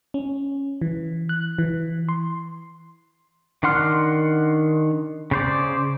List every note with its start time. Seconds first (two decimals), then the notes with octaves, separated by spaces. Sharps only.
0.14 C#4
0.81 E3
1.29 F#6
1.58 E3
2.09 C6
3.63 D#3 D4 F#5 C6 F6
5.31 C#3 C5 D5